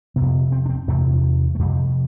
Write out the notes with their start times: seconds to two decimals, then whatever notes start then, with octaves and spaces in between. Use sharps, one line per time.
0.16 F2 C3 B3
0.52 C4
0.66 D4
0.70 C4
0.88 E2 C3 A3
1.55 A3
1.59 F2 C3 G3